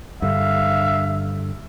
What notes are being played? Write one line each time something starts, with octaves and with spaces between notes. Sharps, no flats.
G2 D3 E5 F5